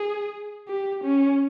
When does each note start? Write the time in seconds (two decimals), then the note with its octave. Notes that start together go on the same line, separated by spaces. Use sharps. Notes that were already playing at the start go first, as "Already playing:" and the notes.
Already playing: G#4
0.68 G4
1.04 C#4